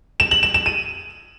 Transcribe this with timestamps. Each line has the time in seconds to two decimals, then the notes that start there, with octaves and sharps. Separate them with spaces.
0.20 E7
0.31 F#7
0.43 E7
0.54 E7
0.66 D#7